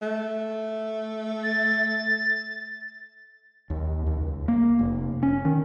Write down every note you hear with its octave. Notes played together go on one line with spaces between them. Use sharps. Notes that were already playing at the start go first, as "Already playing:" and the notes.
A3
A6
D#2
D#2
C#2
A#3
F1
C#4
D#3